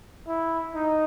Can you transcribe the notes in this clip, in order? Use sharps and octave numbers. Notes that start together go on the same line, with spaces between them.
E4
D#4